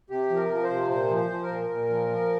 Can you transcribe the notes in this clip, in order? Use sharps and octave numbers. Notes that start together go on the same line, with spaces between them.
C3 G4
F3
A#4
F3
C5
C3
A#2 C5
F3
C5
F3
A#4
A#2
A#2
F3
F3